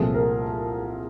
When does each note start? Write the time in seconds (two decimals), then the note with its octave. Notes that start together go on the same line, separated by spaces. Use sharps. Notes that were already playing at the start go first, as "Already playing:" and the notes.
Already playing: C2 A#2 F3 A3 C4 G#4
0.14 A#4